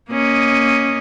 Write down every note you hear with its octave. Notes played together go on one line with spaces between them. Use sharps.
A#3 C#4 D#5